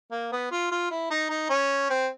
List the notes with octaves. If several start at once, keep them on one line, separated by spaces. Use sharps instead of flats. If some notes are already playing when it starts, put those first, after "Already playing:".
A#3
B3
F4
F4
E4
D#4
D#4
C#4
C4